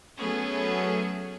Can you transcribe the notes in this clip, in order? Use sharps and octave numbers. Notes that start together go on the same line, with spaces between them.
F#3 A3 B3 C#4 G#4